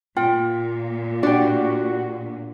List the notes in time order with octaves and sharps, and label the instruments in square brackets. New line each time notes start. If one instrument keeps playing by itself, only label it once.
[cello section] A#2 [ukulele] F4 G5
[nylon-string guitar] D4 [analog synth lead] F#4 [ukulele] G4 D5